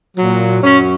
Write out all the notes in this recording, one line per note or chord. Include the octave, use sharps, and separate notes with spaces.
A#2 F#3
F#2 F#3 C#4